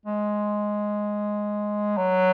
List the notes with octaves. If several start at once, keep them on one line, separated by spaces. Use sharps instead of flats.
G#3
F#3